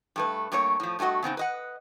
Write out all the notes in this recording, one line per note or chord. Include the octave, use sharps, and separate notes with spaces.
G2 A3 B4
G2 A3 A#3 C#5
A2 F3
G2 A3 D4 F#4 D#5
C#3 B3 C4 D#4
B4 D#5 F#5